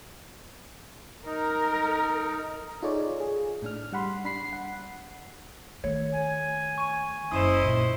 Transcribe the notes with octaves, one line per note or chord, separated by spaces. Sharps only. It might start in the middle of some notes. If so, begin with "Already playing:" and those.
D#4 A#4
D#4 F4 G#4 A4 C#5 D5
G#4
A2 D4 F6
G3 F#5 B5 C6
D4 B5 C7
F#5
D#3 A3 C#5
G#5
C#6 D#7
F#1 C#4 E4 C5 D#5 D#6 D#7 E7
A#2 D3